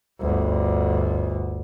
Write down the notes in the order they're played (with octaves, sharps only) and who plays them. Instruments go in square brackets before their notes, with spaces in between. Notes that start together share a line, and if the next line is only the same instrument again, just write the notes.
[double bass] G1 D2